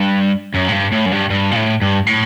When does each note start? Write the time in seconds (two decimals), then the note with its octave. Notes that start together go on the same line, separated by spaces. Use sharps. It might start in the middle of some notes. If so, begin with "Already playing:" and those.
Already playing: G2
0.55 F#2
0.68 A2
0.73 G2
0.92 A2
1.06 F#2
1.12 G2
1.30 G2
1.51 A#2
1.56 A2
1.82 G2
2.06 A2